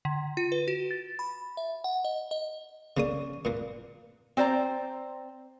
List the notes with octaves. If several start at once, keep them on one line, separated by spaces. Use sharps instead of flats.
D3
F4
B4
F#4
A6
B5
E5
F#5
D#5
D#5
C#3 A#3 C#4 D5 D#6
A#2 A#3 B4
C4 C5 D5 A#5